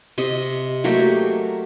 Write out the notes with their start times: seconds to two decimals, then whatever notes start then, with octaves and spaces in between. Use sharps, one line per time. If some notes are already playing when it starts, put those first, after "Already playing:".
0.18 C3 D#5
0.84 F#3 A3 A#3 G4